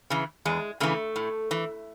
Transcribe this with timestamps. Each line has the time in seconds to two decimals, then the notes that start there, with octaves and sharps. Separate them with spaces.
0.10 C#3 E3
0.45 E2 G#3
0.80 C#3 E3 A3
1.16 A2
1.51 E3